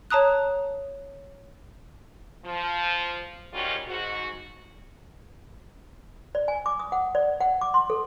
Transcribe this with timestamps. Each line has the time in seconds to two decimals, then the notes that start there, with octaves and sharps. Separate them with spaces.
0.10 C#5 A5 A#5 D#6 F#6
2.44 F3
3.53 G#2 D#3 G3 C#4 F4 F#4
3.88 G#2 F#4
6.35 D5
6.48 G#5
6.66 D6
6.80 D#6
6.92 F#5
7.15 D5
7.40 F#5
7.61 D6
7.74 C6
7.90 A4